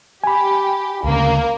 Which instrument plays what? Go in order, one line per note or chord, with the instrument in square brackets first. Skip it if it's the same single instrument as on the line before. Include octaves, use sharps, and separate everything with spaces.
[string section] G4 [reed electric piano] G#5 B5
[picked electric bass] D2 C#3 [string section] A#3 A#4